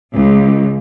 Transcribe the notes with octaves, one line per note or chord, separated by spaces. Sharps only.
C#2